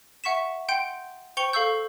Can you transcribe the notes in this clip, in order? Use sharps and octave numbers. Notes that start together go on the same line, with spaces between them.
E5 F#5 C#6 B6 E7
F#5 G5 C6 G6 D7
C5 G5 C#6 C#7 F7 G7
A4 F5 C#6 E6 G6